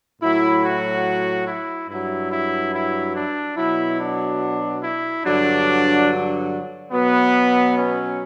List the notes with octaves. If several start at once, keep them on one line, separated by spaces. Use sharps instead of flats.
A2 F#3 E4
F#4
E4
G2 F#3 E4
E4
E4
D4
B2 F#3 E4
D4
E4
G2 D3 F#3 D4
B2 F#3 B3
C#4